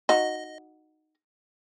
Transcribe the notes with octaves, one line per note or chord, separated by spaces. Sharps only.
D#4 F#4 D#5